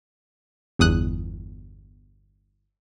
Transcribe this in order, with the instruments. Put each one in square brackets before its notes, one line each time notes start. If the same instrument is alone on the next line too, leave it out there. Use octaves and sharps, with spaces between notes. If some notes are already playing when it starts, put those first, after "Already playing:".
[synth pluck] G1 E2 D#6 F#6